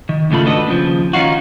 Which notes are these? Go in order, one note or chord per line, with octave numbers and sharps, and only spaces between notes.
D#3
C#2 G#2 C#3 A3 F4 B5
D4 F#4 A4 B4 D#5
D#2 C#3 F3
D#3 C#4 D#4 F4 F#4